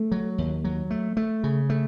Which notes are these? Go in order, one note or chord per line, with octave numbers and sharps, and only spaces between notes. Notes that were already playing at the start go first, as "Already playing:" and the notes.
Already playing: A3
F#3
D#2
F#3
A3
A3
C#3
A3